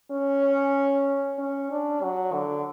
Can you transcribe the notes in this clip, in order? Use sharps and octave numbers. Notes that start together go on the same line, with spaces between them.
C#4
C#4
D4
F#3
D3